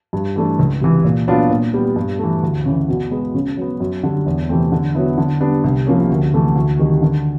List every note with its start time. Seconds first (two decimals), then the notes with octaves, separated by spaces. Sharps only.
0.13 G2
0.36 E3 A3 D4
0.59 C#2
0.81 C3 E3
1.04 A#2
1.28 F#3 B3 D4 F4
1.50 A#2
1.74 G3 B3
1.96 G2
2.19 E3 A3
2.43 D2
2.66 C#3 E3
2.89 B2
3.11 G#3 B3
3.34 C#3
3.57 F#3 B3
3.80 F#2
4.03 D3 G3
4.26 E2
4.49 C3 E3 A3 C4
4.72 D3
4.95 F#3 B3 E4
5.18 D3
5.40 G3 B3 D4
5.64 C2
5.86 C3 F3 A#3 C#4
6.10 D2
6.33 C3 E3 A3
6.55 D2
6.79 C3 D#3 G3
7.02 D3